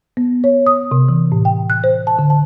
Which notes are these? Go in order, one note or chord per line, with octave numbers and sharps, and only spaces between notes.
B3
C#5
D#6
C3
E3
A2
G5
F#6
C5
A5
D3
A5